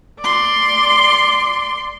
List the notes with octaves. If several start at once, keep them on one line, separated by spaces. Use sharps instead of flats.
D5 C6